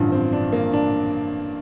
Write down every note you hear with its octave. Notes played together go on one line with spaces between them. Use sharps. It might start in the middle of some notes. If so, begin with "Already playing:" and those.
Already playing: A1 G2 D3 F3
C4
D4
A#3
D4